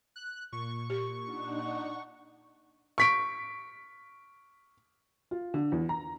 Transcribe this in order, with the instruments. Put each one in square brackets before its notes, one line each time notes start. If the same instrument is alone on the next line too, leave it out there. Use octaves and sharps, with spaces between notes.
[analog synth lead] F#6
[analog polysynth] A#2 [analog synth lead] C#6
[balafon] G4
[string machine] D4 D#4 F#5
[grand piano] C#6 B6 D7
[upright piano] F4
D3
E2
A#5